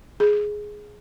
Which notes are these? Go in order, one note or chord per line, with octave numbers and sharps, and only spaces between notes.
G#4